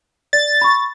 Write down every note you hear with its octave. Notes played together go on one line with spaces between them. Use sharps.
D5 A6
B5 C#6